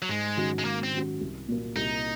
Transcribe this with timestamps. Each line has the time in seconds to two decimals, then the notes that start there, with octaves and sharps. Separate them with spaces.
0.02 F#3
0.09 G#2 G#3
0.37 D#3 F#3 C#4 F#4
0.59 G#3
0.65 G#2 A#3
0.84 C4
0.93 D#3 F#3 C#4 F#4
1.21 C2
1.48 A#2 F#3 A#3
1.76 C2 D#4